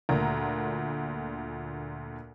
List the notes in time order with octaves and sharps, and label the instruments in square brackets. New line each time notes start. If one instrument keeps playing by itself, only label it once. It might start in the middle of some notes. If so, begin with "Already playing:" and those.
[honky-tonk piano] D2 A#2 A#5